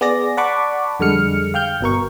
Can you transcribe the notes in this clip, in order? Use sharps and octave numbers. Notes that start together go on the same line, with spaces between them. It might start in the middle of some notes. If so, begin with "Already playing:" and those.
B3 G#4 D5 A#6
D5 F#5 A5 B5 C#6 D6
F2 D3 G3 G#3 F6 C#7
F5 G5 F6 G6
G1 B2 A#4 C#6